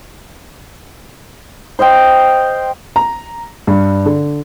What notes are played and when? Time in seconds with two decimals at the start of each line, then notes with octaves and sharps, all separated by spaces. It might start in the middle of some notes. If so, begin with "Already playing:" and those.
1.79 C5 D#5 F5 G5
2.96 A#5
3.67 G2
4.06 D3